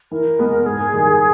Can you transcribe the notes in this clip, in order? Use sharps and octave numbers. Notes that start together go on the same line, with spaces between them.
E3 A#4
G#3 B3
G#2 G#4
D#3 G3 A#3